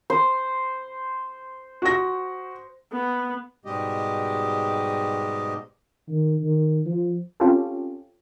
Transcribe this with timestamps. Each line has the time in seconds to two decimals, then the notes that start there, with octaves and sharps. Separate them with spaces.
0.10 C5
1.82 F#4 A#6
2.93 B3
3.65 G#2 B2 G3 G#3 G4 D#5
6.08 D#3
6.41 D#3
6.86 F3
7.40 C4 C#4 F4 G4 A4